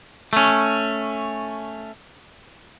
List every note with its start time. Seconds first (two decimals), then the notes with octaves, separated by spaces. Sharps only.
0.33 A3 C#4